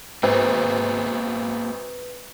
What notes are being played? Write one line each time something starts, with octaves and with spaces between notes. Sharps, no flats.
G#1 A#3 B3 G#4 B4